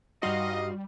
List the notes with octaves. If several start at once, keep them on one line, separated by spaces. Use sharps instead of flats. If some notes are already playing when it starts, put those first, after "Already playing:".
G2 G3 D#4 F#4 G4 D#5 F5 C6